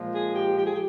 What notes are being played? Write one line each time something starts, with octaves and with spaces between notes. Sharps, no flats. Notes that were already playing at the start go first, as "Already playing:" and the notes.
Already playing: A#2 F3 G#3
G#4
G4
G4
G#4
G4